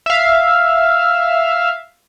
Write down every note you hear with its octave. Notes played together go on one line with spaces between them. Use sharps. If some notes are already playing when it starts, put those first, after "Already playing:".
E5 F5